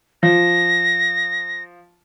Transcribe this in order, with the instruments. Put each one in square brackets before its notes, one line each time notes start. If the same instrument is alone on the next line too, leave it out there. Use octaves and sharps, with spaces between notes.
[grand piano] F3 [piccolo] A#6